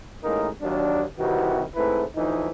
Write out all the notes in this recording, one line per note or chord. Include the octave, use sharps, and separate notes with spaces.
A1 A2 G#3 A#3 D#4 A#4
D#2 F#3 D4
C2 C3 D#3 E3 F#4
G#2 A3 C4 E4 B4
D2 E3 F3 D#4